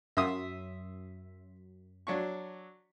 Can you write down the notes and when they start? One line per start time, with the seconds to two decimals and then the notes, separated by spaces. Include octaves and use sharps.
0.17 F#2 E5 C6 D#6
2.07 F#3 D4 C#6